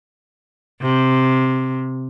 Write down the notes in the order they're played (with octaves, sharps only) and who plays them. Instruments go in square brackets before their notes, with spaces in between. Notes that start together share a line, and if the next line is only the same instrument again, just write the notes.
[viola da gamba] C3